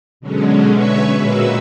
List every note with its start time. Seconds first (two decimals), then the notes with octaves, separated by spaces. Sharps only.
0.20 B2 D3 F#3 G#3 C#4
0.71 B4 C#5 E5 C#6
1.17 A#2 G#3 A#3 F#4 B4 E6